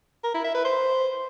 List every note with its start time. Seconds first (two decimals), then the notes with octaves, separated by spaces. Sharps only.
0.24 A#4
0.34 E4
0.44 E5
0.55 B4
0.65 C5